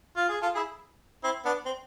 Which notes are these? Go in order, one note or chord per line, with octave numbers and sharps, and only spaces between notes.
F4
G#4
F4 A4
E4 G#4
C4 E4
B3 D4
C4